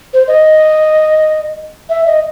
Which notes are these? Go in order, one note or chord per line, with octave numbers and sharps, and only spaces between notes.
C5
D#5
E5
D#5